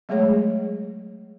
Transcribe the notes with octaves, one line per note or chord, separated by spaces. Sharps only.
F#3 G#3 A3 G#4 C#5